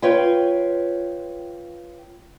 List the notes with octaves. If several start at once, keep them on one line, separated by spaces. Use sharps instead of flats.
F4 B4 C#5 G5